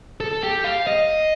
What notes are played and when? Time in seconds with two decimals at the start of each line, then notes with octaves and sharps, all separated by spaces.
0.20 A4
0.43 G4
0.64 F5
0.87 D#5